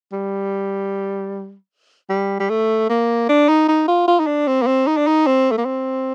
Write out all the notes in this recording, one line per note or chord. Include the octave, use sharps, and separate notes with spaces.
G3
G3
G3
A3
A#3
D4
D#4
D#4
F4
F4
D#4
D4
C4
A#3
C4
D#4
D4
D#4
C4
A3
A#3
C4